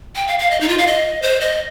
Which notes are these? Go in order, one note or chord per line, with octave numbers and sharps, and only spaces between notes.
G5
F5
F5
D#5
D#4
F4
F5
D#5
C5
D#5